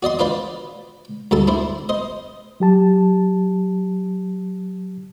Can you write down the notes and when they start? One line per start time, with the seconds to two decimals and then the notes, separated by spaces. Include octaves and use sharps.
0.03 F#4 D5 D#5 C6
0.19 D4 F4 B4 C5 D5
1.31 D2 G2 A4 A5
1.47 D4 E4 C5
1.89 C5 D#5
2.60 F#3 G4 A5